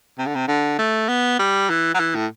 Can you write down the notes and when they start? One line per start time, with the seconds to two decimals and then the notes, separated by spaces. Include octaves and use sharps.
0.18 C3
0.26 D3
0.35 C3
0.48 D3
0.79 A3
1.09 B3
1.39 G3
1.70 E3
1.94 F#3
2.00 E3
2.15 A2